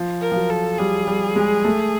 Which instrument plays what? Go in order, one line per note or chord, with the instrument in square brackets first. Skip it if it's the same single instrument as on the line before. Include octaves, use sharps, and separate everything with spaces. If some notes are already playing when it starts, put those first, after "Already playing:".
Already playing: [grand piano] F3
[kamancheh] A#4
[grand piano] F3
F#3
[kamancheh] A4
[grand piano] G3 [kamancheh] G#4
[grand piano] G3
G#3
A3